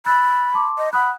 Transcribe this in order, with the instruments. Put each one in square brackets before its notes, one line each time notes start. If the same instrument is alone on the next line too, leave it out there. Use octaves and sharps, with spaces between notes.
[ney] B5 [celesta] E6 F#6 A6
[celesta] A5 C6 D6
[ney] D#5
[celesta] F#5 D#6 F#6 [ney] B5